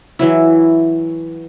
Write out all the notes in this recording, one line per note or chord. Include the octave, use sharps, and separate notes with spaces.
E3 F#3 E4